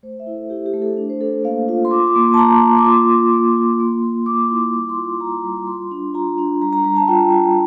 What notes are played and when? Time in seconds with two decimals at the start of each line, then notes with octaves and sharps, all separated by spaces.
0.03 A3 C5
0.20 E5
0.27 E4
0.35 A4
0.50 E4 G4
0.66 G4
0.74 A3
0.82 A4
0.97 D4
1.10 C5
1.21 D4 A4
1.44 A#3 F5
1.69 F4
1.85 C6
1.91 F4 D6
2.07 D6
2.16 A#3
2.23 C6
2.34 A5
2.38 A#3 A#5
2.61 F4
2.78 D6
2.85 F4 C6
3.10 F4
3.33 A#3
3.56 F4
3.80 A#3
4.02 A#3
4.26 A#3 D6
4.50 E4 C6
4.73 G3 D6
4.89 C6
4.97 F4
5.05 C6
5.15 C6
5.20 G3 A#5
5.44 G3
5.56 D6
5.67 F4 C6
5.91 D4
6.14 F4 A#5
6.38 D4
6.62 G3 A#5
6.73 A#5
6.84 G3 A#5
6.96 A5
7.08 F4 G5
7.32 F4